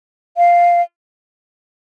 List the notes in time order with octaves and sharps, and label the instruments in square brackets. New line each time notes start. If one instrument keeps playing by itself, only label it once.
[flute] F5